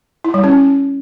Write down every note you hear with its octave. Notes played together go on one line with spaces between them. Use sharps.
E4
G3
C#4